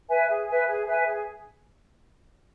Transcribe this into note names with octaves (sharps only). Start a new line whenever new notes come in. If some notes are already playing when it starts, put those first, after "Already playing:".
B4 E5 G#5
G#4
B4 E5 G#5
G#4
B4 E5 G#5
G#4